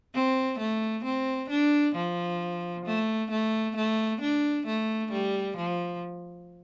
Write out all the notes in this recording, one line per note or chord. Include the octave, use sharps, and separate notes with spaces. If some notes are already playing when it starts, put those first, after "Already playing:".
C4
A3
C4
D4
F3
A3
A3
A3
D4
A3
G3
F3